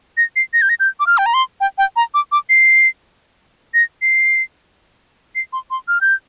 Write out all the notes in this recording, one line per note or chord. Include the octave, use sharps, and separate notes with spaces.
A#6
C7
A#6
G6
A#6
G6
D6
F6
G5
A#5
C6
G5
G5
A#5
D6
D6
C7
A#6
C7
C7
C6
C6
F6
G6